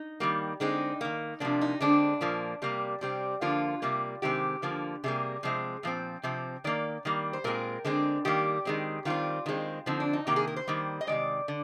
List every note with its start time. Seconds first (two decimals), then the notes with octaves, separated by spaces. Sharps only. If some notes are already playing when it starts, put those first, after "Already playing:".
Already playing: D#4
0.20 D#3 G3 A#3
0.60 D3 G#3 C4 D#4
1.01 D#3 A#3
1.40 C3 F3 A#3 D4
1.61 D#4
1.80 D3 G#3 C4 D4
2.21 A#2 F3 A#3
2.62 C3 G3 A#3
3.01 C3 G3 C4
3.41 D3 F3 A#3 F4
3.82 C3 G3 A#3
4.22 C3 D#3 G#3 C4 G4
4.62 D3 F3 A#3
5.04 C3 G3 A#3 G#4
5.43 C3 F3 G#3 C4
5.83 A#2 F3 C4
6.23 C3 F3 C4
6.64 D#3 A#3 D5
7.05 D#3 G3 A#3
7.33 C5
7.44 A#2 G#3 C4 A#4
7.85 D3 G#3 C4
8.25 D#3 G3 A#3 G4
8.65 D#3 G#3 C4
9.05 D#3 G3 C4 F4
9.46 D#3 G#3 C4
9.86 D3 F3 C4 D#4
10.00 D4
10.13 D#4
10.27 C3 D#3 A#3 G4
10.36 G#4
10.47 A#4
10.56 C5
10.67 D#3 G3 A#3
11.01 D#5
11.07 C3 D#3 G#3 D5
11.48 D3